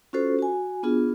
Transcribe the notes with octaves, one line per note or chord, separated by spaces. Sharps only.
C#4 F4 F#4 A4 C5
F#4 G#5
B3 D4 F4 G#4